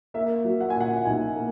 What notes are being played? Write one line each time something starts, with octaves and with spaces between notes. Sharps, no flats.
A#3 E5
F#3
F#5
G#5
A#2
F#5
B1 G#5
A#3